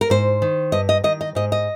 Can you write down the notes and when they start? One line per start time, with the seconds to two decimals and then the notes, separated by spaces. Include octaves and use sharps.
0.01 A#4
0.10 G#2 C5
0.42 D#3
0.72 G2 D#5
0.89 D#5
1.04 D#3 D#5
1.21 D#5
1.35 G#2 D#5
1.52 D#5